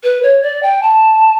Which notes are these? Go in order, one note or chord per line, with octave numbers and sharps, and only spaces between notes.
B4
C#5
D5
G5
A5